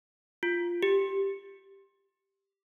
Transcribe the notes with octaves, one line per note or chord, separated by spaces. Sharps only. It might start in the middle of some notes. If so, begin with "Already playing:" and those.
F4
G4